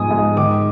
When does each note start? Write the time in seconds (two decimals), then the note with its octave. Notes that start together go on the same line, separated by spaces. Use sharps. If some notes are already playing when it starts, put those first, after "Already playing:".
Already playing: G#2 F3 B3 G#5 D#6
0.11 G#2
0.37 D#3 D6